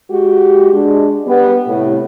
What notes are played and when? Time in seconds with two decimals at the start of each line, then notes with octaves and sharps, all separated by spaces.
0.11 G#3 F#4 G4
0.73 G#3 D4
1.26 G3 B3
1.67 A2 C3